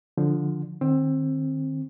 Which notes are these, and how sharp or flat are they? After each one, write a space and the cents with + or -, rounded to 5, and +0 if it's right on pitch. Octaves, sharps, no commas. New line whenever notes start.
D3 +0 F3 +5
D#3 -30 C4 +20